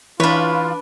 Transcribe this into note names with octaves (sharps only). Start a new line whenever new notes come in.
E3 D4 F4 B4 C#5 B5